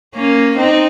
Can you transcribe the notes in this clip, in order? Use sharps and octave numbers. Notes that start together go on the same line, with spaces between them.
A#3 C#4
C4 D#4